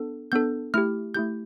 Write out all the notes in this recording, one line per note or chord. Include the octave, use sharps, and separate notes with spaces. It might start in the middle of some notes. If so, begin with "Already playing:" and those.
Already playing: B3 D4 A4
B3 D4 A4 G6
A3 E4 G4 F6
A3 E4 G4 G6